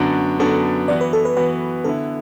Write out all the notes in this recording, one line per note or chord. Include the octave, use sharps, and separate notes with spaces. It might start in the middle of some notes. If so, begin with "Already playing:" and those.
Already playing: F#2 D3 B3 D4 F#4
F#2 D3 B3 D4 F#4 A4
E3 B3 F#4 D5
B4
A4
B4
E3 B3 F#4 B4
D3 B3 E4 A4